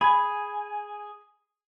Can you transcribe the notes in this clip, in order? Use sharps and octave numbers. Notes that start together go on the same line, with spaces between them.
G#4 G#5 B5